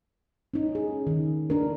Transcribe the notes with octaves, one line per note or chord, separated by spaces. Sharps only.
C#4 D#4
G#4
D#3
D4 A#4